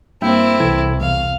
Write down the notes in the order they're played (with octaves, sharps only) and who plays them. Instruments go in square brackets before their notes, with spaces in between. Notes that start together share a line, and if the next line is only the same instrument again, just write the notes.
[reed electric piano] G2 E5 G5 [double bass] A#3 [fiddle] C4 E4
[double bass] C2 [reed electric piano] E3 A4 G#6
[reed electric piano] E2 [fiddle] F5